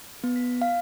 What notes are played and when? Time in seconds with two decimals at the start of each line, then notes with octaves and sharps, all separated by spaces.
0.24 B3
0.36 B6
0.62 F5